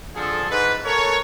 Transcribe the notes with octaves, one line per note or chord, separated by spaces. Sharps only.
D3 F3 G#4 A4
G#2 B4
A4 A#4 C#5